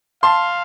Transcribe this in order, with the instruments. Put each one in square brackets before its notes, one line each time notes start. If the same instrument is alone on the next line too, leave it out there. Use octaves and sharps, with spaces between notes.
[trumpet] F5 [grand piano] A5 C6